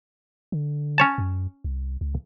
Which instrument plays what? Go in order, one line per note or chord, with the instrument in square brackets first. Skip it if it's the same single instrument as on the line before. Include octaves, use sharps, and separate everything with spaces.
[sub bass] D3
[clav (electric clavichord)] C#4 C#5 A5
[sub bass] F#2
C2
C#2